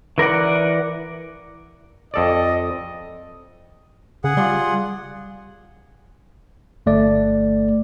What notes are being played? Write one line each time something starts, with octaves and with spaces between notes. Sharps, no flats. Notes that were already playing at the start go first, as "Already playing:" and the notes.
E3 A#4 D5 F#5
F2 A4 D5 D#5
C#3 G#4 F#5
G3 F4 D5 C6
G1 A3 D5